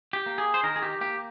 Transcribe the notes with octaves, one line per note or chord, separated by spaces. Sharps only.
G4
A#3
G#4
C5
D#3 A#4
G#4
G4
A#3 G4